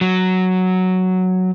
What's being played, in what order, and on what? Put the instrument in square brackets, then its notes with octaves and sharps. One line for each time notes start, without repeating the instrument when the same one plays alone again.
[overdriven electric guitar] F#3